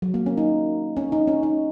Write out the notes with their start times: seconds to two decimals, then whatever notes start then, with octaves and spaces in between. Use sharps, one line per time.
0.02 F#3
0.14 A#3
0.26 C#4
0.37 D#4
0.97 C#4
1.12 D#4
1.27 C#4
1.43 D#4